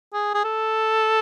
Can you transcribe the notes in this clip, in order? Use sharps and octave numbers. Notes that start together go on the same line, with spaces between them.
G#4
G#4
A4